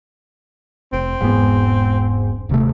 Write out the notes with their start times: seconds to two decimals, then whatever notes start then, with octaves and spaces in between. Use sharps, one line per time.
0.93 F1 C4
1.21 E1 G#2 B3
2.49 D#1 C3 A3